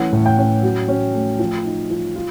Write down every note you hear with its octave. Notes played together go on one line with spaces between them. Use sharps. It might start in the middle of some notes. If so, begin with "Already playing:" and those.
Already playing: E3 A3 C#4 F#5
A2
G5
C#4
F#3
C#4
A3
F3
D#4
F3
F4